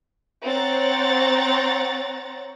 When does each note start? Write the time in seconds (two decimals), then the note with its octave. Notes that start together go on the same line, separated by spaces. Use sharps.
0.43 C4 C#5 F#5 A#5 A6